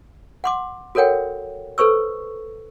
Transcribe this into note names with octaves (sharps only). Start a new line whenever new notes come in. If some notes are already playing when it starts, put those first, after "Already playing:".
F#5 C6 D6
F#4 A4 A#4 C#5 F#5 G5
A4 B4 C5 C#6 E6